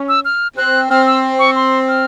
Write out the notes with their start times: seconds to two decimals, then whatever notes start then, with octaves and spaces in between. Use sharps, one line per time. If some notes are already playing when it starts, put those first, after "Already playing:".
Already playing: C#4
0.09 E6
0.25 F6
0.57 C4 F#6
0.90 C4 F6
1.06 E6
1.39 C#6
1.55 C6
1.88 F6